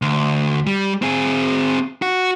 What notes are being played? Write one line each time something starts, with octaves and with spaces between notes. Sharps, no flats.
D2
G3
C4 G#4
F#4